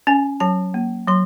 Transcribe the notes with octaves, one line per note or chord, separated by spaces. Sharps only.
C#4 G#5
F#3 A5
A#3
F#3 C6